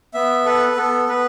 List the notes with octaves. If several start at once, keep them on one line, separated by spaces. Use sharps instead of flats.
B3 E5
A4 B4
B3 A4
B3 B4